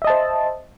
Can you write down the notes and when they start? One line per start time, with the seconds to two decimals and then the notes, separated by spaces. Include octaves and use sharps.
0.02 E5
0.04 D#5
0.07 A5
0.10 C5